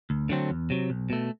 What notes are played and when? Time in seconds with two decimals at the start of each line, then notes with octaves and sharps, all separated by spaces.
0.10 D2
0.29 D3 F#3 A3 C4
0.50 E2
0.70 C3 F#3
0.90 B1
1.10 B2 A3